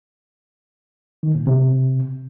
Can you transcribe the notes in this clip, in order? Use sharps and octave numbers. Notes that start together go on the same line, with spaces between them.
D#3
A#2
C3